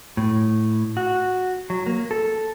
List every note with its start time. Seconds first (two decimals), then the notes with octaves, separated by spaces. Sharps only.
0.17 A2
0.97 F#4
1.70 F#3
1.87 A#3
2.11 A4